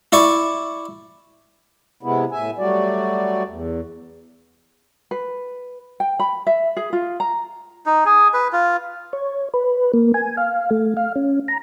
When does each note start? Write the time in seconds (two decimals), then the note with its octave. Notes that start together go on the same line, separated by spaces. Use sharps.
0.12 E4 D5 C#6
2.03 C3 G#3 B3 E4
2.32 A2 E5 G#5
2.58 F#3 G3 A3 F#4 D5
3.48 E2
5.11 B4
6.00 G5
6.19 B5
6.47 E5
6.77 G#4
6.93 F4
7.20 A#5
7.86 D#4
8.05 G#4
8.34 B4
8.53 F4
9.13 C#5
9.54 B4
9.94 A#3
10.14 G#5
10.37 F5
10.71 A3
10.97 F5
11.16 C#4
11.48 A#5